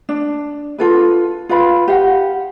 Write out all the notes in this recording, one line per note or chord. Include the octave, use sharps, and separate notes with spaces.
D4
F4 A4 B4
F4 B4 F5 B5
G4 F5 F#5